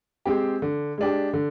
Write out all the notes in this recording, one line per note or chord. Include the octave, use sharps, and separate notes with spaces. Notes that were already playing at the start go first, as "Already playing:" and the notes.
G#3 C4 G4
D3
G#3 D4 G4
D3